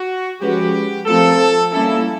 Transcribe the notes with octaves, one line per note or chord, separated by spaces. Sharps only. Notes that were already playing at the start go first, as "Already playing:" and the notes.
Already playing: F#4
F3 G#3 C#4 F#4 G4 B4
F3 A3 C4 F4 A4 A#4
G3 A#3 C#4 E4 A4